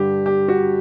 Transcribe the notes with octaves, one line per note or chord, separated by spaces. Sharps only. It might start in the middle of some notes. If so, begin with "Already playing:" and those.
Already playing: G2 D3 G4
G4
F#4